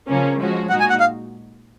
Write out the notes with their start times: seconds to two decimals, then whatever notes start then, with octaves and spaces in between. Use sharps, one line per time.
0.08 C#3 F3 A#3 C#4
0.39 F3 G#3 C#4 F#4
0.69 A#2 G#3 D#4 F#4 F#5
0.80 G#5
0.90 F#5
1.00 F5